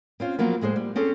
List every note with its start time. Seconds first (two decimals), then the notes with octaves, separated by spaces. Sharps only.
0.20 C4 C#4 F4
0.39 F3 F#3 A#3 B3
0.61 A2 G#3 G#4 C5
0.76 G3
0.96 C4 C#4 G#4 A4